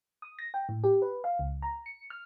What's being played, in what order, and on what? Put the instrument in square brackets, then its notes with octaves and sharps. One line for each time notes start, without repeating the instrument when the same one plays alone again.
[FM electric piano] D#6
A#6
G5
A2
G4
B4
F5
C#2
A#5
C#7
F6